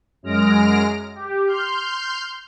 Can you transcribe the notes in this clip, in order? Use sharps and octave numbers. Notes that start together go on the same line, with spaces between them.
F#2 G#3 F6 A#6 D7
G4
C6 F6 G6